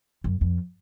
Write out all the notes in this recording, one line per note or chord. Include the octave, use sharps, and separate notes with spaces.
F#2
F2